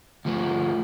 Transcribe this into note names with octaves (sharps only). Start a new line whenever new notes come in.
D2 F3